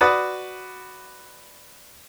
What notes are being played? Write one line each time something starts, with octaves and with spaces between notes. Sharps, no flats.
F#4 B4 D5 D#6